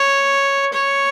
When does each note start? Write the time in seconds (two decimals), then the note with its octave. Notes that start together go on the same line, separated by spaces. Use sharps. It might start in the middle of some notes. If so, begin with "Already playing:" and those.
Already playing: C#5
0.73 C#5